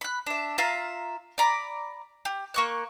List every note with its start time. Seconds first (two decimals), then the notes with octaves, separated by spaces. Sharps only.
0.01 B5 F#6
0.26 D4 E5
0.58 F4 E5 F5 A#5
1.38 D5 A#5 B5
2.25 G4
2.54 A#3 C#6 F#6